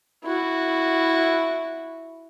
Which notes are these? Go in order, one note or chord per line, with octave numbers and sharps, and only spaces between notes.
E4 F#4